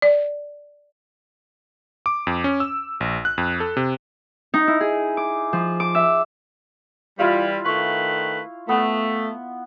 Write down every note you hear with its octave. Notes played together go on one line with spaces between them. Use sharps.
D5
D6
F2
C#4
E6
A#1
F#6
F2
A4
C3
D#4
E4
G#4
D6
F3
D6
E5
E3 G3 E4 F4 F5
D#3 A3 B4 C#6
A3 B3